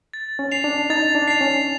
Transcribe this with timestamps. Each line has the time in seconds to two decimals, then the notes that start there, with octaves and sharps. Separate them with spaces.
0.13 A6
0.39 C#4
0.52 C7 F7
0.64 D4
0.90 D#4 A6
1.15 D4
1.28 C7 F7
1.41 C#4